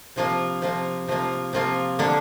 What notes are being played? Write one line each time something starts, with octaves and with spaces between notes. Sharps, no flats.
C3 F3 A#3 F4
C3 F3 A#3 F4
C3 F3 A#3 F4
C3 F3 A#3 F4
D3 A#3 D4